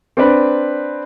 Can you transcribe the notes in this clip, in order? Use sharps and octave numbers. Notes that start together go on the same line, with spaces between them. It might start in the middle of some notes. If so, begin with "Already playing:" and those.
C4 D4 B4